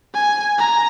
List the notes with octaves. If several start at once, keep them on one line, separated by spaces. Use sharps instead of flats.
G#5
A#5